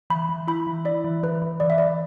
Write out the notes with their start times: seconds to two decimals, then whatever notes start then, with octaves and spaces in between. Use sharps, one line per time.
0.10 E3 B5
0.29 E3
0.47 E4 B5
0.67 E3
0.85 E4 D5
1.04 E3
1.23 E3 B4
1.42 E3
1.60 E3 D5
1.70 E5
1.78 E3 D5